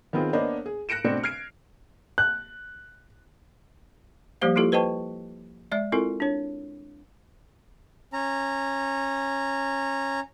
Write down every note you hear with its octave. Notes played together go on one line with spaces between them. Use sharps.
D#3 B3 C4 F4 G#4
A#3 B3 D4 C5 C#5 D#5
G#4
F#6 A#6 C#7 D7 E7
B2 A3 C4 D4 C#7
F6 G#6 C7 D7
F#6
F3 G3 A#3 G4 C5 F5
A#3 E4 F4 G4 A4
B4 C5 D#5 G5 A5 C#6
G#3 D5 E5
C4 E4 F4 A4 A#4
D4 C#5
C#4 A#5